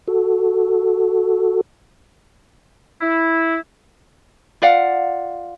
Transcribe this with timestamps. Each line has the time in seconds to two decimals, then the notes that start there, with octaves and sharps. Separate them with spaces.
0.08 F#4 A4
3.01 E4
4.62 F4 D5 F5 F#5